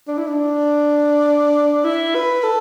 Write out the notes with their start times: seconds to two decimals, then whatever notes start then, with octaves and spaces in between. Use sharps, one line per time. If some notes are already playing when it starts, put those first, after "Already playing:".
0.08 D4
0.18 E4
0.27 D4
1.84 E4
2.15 B4
2.43 A4